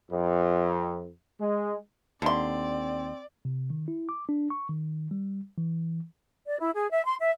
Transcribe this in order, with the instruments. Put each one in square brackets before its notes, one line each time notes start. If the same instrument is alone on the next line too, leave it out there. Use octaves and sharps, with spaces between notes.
[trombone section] F2
G#3
[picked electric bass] D#2 [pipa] D3 C6 [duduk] C4 [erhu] D5
[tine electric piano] C3
D#3
E4
D6
D4
C#6
D#3
G3
E3
[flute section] D5
E4
G#4
E5
C6
E5